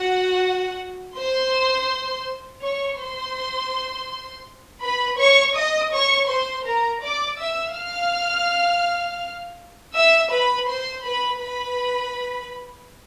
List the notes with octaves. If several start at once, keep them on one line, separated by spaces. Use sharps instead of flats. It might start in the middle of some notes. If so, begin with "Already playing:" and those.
Already playing: F#4 F#5
C5 C6
C#5 C#6
C5 C6
B4 B5
C#5 C#6
D#5 D#6
C#5 C#6
C5 C6
A#4 A#5
D5 D6
E5 E6
F5 F6
E5 E6
B4 B5
C5 C6
B4 B5
B4 B5